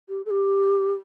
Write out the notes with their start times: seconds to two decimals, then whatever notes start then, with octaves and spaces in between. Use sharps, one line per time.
0.09 G4
0.26 A4
0.30 G4